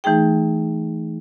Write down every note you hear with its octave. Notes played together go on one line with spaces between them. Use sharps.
E3 A3 D#4 G#4 G5